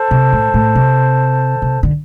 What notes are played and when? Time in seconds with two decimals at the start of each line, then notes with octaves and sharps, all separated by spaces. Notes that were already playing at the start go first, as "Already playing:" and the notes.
Already playing: A4 C5 A5
0.11 C3
0.32 A2
0.54 A2
0.75 C3
1.62 C3
1.83 D3